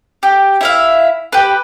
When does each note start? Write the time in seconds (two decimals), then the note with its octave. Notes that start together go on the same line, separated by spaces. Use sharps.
0.23 G4
0.61 E4 E5 F5
1.32 G4 B4